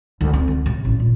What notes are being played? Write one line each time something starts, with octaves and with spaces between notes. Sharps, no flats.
D2
C4
D2
C3
A1
A#2